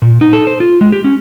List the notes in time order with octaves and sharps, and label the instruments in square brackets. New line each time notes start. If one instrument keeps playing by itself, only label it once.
[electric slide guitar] A#2
D#4
A4
C5
F4
G#3
G4
C#4